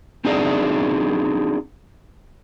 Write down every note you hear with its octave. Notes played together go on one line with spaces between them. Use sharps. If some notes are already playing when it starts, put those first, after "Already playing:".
C4 D4 D#4 F#4 G#4 D5